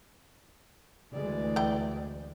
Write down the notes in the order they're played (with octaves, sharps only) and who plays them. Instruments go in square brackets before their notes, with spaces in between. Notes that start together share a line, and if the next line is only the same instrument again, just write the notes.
[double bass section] D2 E3 G#3 [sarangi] D5
[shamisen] E4 G5